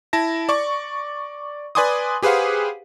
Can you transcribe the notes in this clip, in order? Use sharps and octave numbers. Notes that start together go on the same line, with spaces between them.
E4 A5 A#6
D5 C#6
B4 D5 G#5 C6 D6 D#6
G4 G#4 B4 C5 F5 F#5